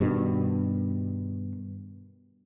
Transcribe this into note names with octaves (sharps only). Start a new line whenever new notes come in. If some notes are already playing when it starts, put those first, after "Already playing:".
G2 B2 D#3